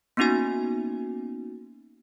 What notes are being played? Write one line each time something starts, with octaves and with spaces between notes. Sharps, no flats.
A#3 B3 C#4 D#4 F#4 G#5